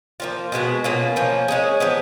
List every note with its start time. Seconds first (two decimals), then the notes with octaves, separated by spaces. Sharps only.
0.20 F3 A#3 C#4 F4
0.52 B2 G#3 B3 F#4
0.84 B2 A#3 C#4 F4
1.16 F3 A#3 C#4
1.48 G#3 C#4 G#4
1.80 F3 B3 D#4